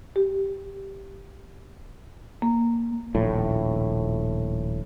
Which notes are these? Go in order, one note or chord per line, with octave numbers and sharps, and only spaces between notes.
G4
A#3
D#1 A#1 A2